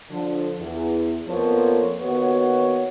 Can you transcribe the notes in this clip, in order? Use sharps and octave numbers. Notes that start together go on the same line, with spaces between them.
D3 F3
E2
F2 F3 A#3 B3 C#5
D#2 B3 F#4 C#5